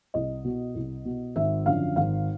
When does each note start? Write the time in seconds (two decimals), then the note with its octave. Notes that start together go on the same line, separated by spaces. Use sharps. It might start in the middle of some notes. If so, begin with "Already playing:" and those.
0.14 C2 D#5
0.45 B2
0.75 C2
1.05 B2
1.36 G#1 E5
1.66 F#2 D3 F3 F5
1.96 G#1 F5